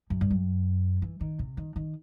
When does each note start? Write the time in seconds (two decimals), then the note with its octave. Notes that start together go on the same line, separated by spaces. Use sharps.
0.10 F#2
0.21 G2
0.31 F#2
1.02 E3
1.21 D#3
1.39 C3
1.57 D#3
1.76 D#3